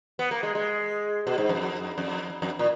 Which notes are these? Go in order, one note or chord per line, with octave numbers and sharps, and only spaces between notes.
B3
A#3
G#3
G#3
B2
G#2
F2
F2
F2
A#2